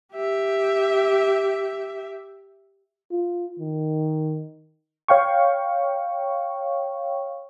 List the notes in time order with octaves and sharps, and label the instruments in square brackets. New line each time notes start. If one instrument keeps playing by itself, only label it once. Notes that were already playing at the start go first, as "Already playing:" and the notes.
[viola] G4 E5
[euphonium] F4
D#3
[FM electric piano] C#5 F5 G5 C#6